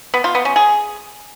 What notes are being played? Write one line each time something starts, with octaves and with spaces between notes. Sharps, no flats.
B3
F4
B3
C#4
G#4